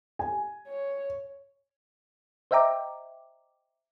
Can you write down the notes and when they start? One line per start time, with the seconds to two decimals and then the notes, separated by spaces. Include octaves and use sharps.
0.19 G#5
0.68 C#5
2.51 C5 D#5 E5 G5 A#5 D6